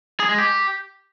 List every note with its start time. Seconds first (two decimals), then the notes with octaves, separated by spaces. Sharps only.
0.20 G#4
0.29 G#3
0.38 G4